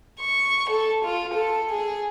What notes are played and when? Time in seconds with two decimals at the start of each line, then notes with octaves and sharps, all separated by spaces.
0.21 C#6
0.70 A4
1.05 F4
1.35 A4
1.71 G#4